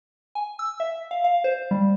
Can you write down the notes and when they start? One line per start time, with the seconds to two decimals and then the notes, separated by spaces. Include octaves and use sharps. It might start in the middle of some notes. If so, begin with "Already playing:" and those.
0.35 G#5
0.59 E6
0.80 E5
1.11 F5
1.24 F5
1.44 C5
1.71 G3